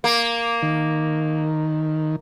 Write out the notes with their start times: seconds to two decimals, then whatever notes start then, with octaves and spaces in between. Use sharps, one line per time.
0.04 A#3
0.63 D#3